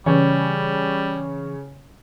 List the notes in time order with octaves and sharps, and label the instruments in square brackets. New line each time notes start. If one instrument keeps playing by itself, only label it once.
[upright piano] C#3 C#5 [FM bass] E3 [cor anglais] G3